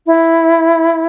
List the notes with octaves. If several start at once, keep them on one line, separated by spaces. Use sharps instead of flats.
E4